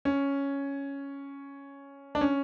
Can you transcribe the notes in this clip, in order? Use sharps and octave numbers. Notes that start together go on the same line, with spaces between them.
C#4
D4
C#4